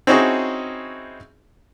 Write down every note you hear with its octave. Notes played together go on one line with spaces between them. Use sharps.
C4 C#4 D#4 E4 F#4 G#4